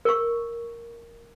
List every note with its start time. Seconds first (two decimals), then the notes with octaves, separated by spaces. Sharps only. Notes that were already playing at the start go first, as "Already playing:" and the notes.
0.05 A#4 C#6